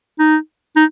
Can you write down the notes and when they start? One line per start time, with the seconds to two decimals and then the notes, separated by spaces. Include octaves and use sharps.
0.19 D#4
0.76 D#4